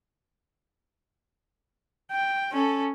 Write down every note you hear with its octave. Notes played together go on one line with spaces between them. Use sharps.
G5
C#4 A4